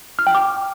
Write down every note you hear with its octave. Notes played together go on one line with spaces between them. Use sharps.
F6
G5
D6